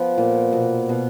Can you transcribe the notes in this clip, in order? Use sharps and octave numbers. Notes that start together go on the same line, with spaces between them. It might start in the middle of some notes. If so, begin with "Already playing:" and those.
Already playing: F3 B3
A#2
B2
B2